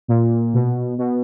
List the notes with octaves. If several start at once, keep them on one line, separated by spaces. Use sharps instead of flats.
A#2
B2
B2